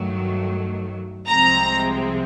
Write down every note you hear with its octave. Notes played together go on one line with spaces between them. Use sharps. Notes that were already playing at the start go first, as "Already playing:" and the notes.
Already playing: G2 D#3 F#3 A3
C2 C3 F3 G#3 C4 A#5